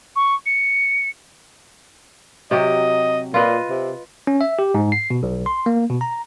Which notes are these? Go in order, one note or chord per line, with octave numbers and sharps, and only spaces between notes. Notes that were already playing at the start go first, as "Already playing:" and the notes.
C#6
C#7
C3 F#3 G4 D#5
A#2 F4 B4 D#5
C3
C#4
E5
G4
G#2
C7
B2
B1
C6
A#3
B2
A#5